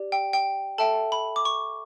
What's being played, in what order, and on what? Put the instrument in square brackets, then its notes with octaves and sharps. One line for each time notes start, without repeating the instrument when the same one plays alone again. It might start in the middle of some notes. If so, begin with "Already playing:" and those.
Already playing: [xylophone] G4 D5
G5
G5
A4 E5 G5 A5
B5
D6
C#6